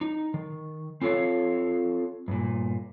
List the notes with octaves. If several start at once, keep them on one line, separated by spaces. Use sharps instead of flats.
D#4
D#3
C4 F4 A4 C#5 F5
G2 A#2